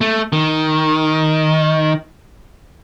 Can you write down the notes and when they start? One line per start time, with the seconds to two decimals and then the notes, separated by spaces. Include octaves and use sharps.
0.01 A3
0.33 D#3